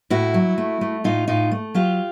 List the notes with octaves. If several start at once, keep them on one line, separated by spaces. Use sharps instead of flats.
A2 E4 F#4
F#3
A3
A3
A2 D#4 F4
A2 D#4 F4
A3
F#3 F4 G4